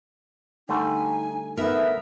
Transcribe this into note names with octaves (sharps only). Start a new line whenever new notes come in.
D3 G3 A3 D#4 G#5
B3 D#4 A#4 E5